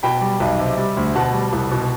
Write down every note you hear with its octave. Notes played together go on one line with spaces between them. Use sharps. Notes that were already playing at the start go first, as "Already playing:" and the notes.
B2 G5 B5
G3
B1
C3
G3
D2
B2 F#5 A5
G3
C2
B2